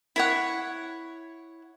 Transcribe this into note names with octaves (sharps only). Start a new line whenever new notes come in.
E4 C#5 F#5